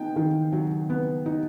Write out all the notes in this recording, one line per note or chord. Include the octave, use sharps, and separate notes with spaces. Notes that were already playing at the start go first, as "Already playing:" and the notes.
Already playing: B3 D#4 G5
D#3
F#3
B3
D#4